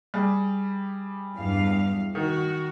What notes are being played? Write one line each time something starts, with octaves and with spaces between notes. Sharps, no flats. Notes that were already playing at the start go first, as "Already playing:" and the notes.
G3 G4 G#4
E2 G2 F5
D#3 F#4